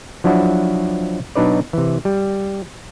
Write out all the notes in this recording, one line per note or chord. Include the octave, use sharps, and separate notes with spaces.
F3 F#3 D4 E4 F#4
B2 F#3 D4 D#4 B4 D5
C3 E3
G3